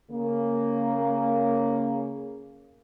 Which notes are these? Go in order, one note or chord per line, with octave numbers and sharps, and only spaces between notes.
C#3 A#3